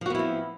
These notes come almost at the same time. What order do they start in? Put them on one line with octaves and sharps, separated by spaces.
F3 F#4 B3 E4 C4